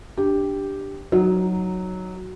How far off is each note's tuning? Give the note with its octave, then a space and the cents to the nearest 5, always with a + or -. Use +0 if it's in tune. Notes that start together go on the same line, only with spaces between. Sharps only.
D4 +0 G4 +0
F#3 +0 D#4 +0